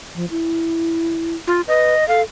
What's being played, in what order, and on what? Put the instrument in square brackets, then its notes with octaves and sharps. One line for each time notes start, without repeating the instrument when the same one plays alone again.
[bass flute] F3
E4
[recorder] F4
[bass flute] B4 [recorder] D#5
[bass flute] A4 [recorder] F5